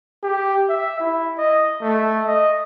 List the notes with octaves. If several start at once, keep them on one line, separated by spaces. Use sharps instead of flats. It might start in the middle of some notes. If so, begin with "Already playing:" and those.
G4
E5
E4
D#5
A3
D#5